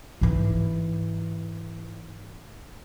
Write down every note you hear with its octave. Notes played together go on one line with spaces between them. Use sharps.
G#2 E3